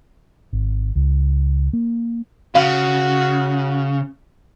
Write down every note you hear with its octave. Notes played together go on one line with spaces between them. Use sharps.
G#1
C#2
A#3
C#3 F#4 F5